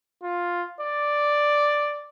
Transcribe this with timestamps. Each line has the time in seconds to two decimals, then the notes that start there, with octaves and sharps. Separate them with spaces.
0.23 F4
0.81 D5